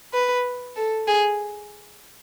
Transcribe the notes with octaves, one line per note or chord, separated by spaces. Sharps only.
B4
A4
G#4